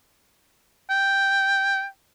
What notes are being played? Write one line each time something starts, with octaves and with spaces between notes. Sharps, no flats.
G5